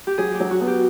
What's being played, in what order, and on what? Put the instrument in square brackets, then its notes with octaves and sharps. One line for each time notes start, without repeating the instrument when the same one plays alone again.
[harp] G4
[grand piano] F#3 [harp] G#4
[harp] G4
[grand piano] F#3
[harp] F#4
[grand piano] B3
[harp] G4